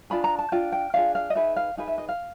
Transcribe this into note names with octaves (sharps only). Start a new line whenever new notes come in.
D4 F4 G#4 B5
A#5
A5
D4 F4 G5
G5
D4 F4 G#4 F5
F5
D#5
D#4 G#4 B4 E5
F5
D#4 G#4 B4 F5
E5
D#5
F5